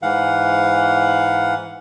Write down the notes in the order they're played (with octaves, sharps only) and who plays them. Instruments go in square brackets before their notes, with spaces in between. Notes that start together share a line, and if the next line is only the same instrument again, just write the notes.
[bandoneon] G#2 E3 F5 F#5